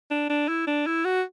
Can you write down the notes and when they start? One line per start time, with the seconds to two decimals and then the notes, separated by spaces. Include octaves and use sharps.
0.11 D4
0.30 D4
0.48 E4
0.67 D4
0.87 E4
1.05 F#4